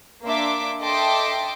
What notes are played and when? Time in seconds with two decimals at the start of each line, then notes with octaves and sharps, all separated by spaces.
0.24 A#3 D4 E5 C6 D6
0.81 A4 D#5 E5 G5 C6 D6